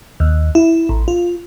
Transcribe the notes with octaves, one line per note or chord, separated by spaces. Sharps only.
D#2
E4
A1
F4